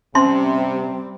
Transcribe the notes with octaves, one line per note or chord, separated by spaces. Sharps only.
C3 G3 C4 C#4 C6